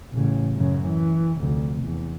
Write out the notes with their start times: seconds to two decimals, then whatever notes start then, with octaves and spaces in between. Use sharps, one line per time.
0.13 A1 C#3
0.55 F#2 C#3
0.87 E3
1.37 F1 D2
1.83 E2